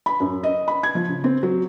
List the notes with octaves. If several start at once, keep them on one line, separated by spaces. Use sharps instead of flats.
B5
F#2
D#5
B5
G#6
F3
C#3
C4
F#3